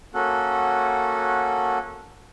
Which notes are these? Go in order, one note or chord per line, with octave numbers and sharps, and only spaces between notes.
A#3 C#4 F#4 A4 F#5